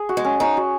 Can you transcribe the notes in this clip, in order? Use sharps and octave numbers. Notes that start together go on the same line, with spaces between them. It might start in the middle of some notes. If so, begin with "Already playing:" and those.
Already playing: G#4
F#4
G#3
C#4
C#4 D#4
F#4